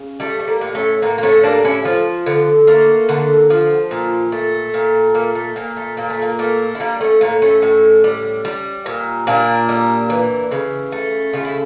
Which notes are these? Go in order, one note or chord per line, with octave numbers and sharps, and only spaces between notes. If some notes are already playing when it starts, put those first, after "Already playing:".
Already playing: C#3
G3 A3
A3
A#3
A2
A3 C#4
A2 A#3
A#3
A3 C#4
G3 A#3 D4
C#4 E4
F3
D3
A3 A#3
D3
F3
A#2
A3
A#2
A3 A#3
A3
A#2 A#3
A3
A#2 A#3
A3
A#3
A3 A#3
E4
G3 A#3 D4
A3 C#4
A2 A#3
A3 C#4
A2
G3
G3
A#2
A#2 A#3 D4
G3
E3
C#3
A3
C#3 F4
E4